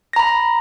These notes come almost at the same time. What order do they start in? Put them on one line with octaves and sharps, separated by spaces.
A#6 A#5 B5